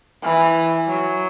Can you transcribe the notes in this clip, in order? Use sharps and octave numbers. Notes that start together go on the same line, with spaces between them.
E3
F#3